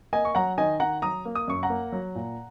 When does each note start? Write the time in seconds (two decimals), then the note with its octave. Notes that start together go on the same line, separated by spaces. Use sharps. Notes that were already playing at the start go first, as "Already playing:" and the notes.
0.13 A#3 D#5 G#5
0.25 C#6
0.35 F#3 F#5 A#5
0.58 D#3 D#5 G#5
0.80 D#3 F#5 A#5
1.02 F#3 A#5 D#6
1.25 A#3
1.35 D#6
1.48 F#2 C#6
1.63 F#5 A#5
1.70 A#3
1.92 F#3
2.15 A#2